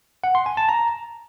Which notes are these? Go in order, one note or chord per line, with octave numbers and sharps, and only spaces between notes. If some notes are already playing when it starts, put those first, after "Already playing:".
F#5
C6
G#5
A5
A#5